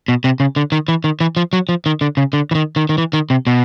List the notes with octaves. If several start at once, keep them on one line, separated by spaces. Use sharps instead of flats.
B2
C3
C#3
D3
D#3
E3
D#3
E3
F3
F#3
F3
D#3
D3
C#3
D3
E3
D#3
D#3
D#3
E3
D#3
C3
B2